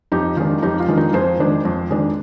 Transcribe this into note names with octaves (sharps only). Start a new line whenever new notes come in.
F2 D#4 G4
D#3 G#3 D4 F4
F2 D#4 G4
F4
D#3 G#3 D4
D#4
F2 G#4 C5
D#3 G#3 D4
F2
D#3 G#3 D4